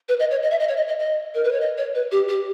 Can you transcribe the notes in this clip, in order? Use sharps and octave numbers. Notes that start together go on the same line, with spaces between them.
B4
D#5
C#5
D#5
E5
D#5
C#5
D#5
D#5
D#5
A#4
B4
C#5
D#5
C#5
B4
G4
G4